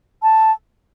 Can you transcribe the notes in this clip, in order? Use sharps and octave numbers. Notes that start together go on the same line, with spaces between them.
A5